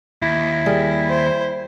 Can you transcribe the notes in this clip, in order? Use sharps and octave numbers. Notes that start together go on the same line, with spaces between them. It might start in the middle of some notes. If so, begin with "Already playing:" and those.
D#2 E4
G3 G#4 A#4
C5